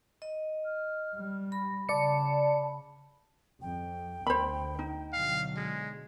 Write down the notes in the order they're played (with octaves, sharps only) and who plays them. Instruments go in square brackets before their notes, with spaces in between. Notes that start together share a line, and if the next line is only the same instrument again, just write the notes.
[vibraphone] D#5
[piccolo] F6
[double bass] G3
[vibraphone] B5 [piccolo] A#6
[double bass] C#3 [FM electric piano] D5 C#7 [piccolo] A5
[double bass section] F2 [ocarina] G5
[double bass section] D2 [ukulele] C5 B5
[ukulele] D#4
[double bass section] B2 D3 F#3 [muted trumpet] F5
[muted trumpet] G#3